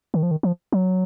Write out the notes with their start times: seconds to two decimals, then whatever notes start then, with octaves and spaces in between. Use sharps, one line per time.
0.14 D#3
0.23 F3
0.31 D#3
0.43 F3
0.72 F#3